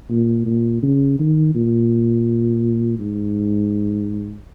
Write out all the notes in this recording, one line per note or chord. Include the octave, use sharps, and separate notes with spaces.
A#2
A#2
C#3
D#3
A#2
G#2